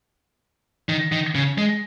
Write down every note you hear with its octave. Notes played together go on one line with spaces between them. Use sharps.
D#3
D#3
C#3
G#3